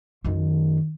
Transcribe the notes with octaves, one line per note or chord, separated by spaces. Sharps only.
F#2 D#3